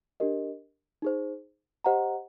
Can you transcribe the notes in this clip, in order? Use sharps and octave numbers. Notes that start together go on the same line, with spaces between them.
D4 G4 A#4 D#5
D#4 G#4 C5
G4 C5 D#5 F#5 A#5